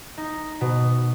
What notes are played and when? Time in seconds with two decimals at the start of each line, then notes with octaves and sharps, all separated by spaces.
0.17 D#4
0.61 B2